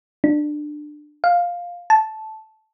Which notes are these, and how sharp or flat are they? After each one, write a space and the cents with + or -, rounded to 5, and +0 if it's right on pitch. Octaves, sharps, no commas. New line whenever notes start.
D4 +20
F5 +5
A5 -10